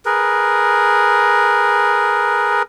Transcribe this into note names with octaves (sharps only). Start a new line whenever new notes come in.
G#4 A#4 B4